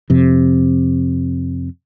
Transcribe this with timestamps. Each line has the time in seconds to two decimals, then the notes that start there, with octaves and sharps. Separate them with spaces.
0.10 F2 C3